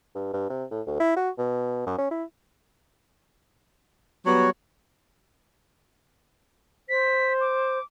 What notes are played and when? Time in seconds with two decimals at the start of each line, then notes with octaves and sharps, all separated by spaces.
0.15 G2
0.33 G2
0.50 C3
0.71 A2
0.87 D2
1.00 E4
1.16 F#4
1.38 B2
1.86 F#2
1.98 C#4
2.11 E4
4.26 F#3 G3 B3 F#4 C#5
6.89 C5 B6
7.41 D6